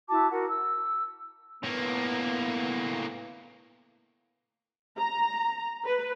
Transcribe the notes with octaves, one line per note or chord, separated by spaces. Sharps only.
E4 F#4 A5 D6
F#4 A#4 F#5
E6
A2 A#3 B3
A#5
B4